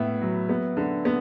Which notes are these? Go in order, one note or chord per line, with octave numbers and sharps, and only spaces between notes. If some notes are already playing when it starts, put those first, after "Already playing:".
Already playing: A2 B3 E5
F#3
B3
D3
B3